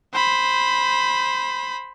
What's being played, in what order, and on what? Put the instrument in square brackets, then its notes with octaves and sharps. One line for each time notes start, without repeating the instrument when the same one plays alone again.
[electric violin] C5 B5